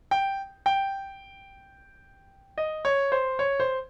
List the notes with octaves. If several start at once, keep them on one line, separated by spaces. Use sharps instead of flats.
G5
G5
D#5
C#5
C5
C#5
C5